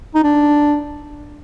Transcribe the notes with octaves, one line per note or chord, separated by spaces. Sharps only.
D#4
D4